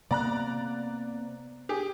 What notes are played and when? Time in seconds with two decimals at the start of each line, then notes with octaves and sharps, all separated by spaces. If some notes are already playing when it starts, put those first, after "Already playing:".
0.11 C3 A#3 B3 D5 A#5 F#6
1.69 G4 G#4